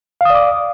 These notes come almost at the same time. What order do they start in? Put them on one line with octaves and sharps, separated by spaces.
F5 D#6 D5 D6